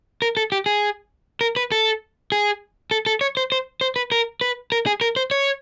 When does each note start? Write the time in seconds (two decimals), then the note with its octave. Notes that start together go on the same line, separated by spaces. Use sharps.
0.22 A#4
0.37 A4
0.52 G4
0.66 G#4
1.41 A#4
1.56 B4
1.72 A4
2.32 G#4
2.91 A4
3.06 A4
3.21 C#5
3.37 C5
3.52 C5
3.81 C5
3.96 B4
4.12 A#4
4.41 B4
4.72 A#4
4.86 G#4
5.01 A#4
5.16 C5
5.31 C#5